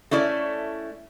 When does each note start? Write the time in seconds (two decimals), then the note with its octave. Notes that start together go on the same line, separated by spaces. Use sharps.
0.11 A3 C#4 E4 D5